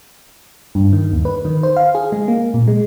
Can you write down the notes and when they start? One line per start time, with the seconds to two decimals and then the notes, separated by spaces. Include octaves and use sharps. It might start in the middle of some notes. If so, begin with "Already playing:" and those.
0.75 G2
0.93 D#3
1.13 D#2
1.25 B4
1.45 D#3
1.63 C5
1.76 F5
1.95 G#4
2.12 G#3
2.28 A#3
2.54 A#2
2.68 G#3